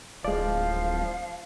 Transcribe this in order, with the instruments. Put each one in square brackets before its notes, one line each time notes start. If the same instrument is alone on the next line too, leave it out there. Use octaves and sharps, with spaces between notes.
[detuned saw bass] D1 [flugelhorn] F3 [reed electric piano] G#3 D5 [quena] F5